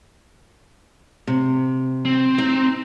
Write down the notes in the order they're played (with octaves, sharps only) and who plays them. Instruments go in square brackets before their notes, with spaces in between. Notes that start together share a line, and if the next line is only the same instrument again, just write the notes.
[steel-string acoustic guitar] C3
[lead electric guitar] C4
[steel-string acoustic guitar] D#4